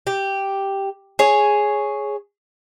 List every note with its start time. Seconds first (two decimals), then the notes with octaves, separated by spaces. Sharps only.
0.07 G4
1.19 G#4 C#5